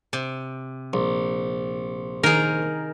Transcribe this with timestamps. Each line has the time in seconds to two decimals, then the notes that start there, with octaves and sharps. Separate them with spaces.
0.13 C3
0.93 A#1
2.23 D#3 G#4 A#4